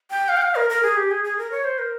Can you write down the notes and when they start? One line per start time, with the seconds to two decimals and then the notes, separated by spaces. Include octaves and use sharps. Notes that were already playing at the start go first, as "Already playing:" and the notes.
0.11 G5
0.29 F5
0.37 G5
0.42 F5
0.56 A#4
0.70 A#4
0.83 G#4
0.97 G4
1.11 G#4
1.24 G#4
1.38 A#4
1.51 C#5
1.64 C5
1.79 A#4